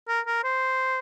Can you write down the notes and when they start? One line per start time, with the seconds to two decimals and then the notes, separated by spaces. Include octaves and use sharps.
0.08 A#4
0.27 A#4
0.44 C5